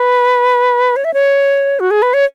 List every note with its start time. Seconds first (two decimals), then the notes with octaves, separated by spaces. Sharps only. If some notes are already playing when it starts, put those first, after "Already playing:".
Already playing: B4
0.96 C#5
1.04 E5
1.14 C#5
1.80 F#4
1.91 G#4
2.02 B4
2.14 C#5